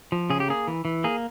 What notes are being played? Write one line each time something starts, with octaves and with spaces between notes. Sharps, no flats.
F3
C#3 G#4
G4
A#3 G#4
E3
E3
A#3 G#4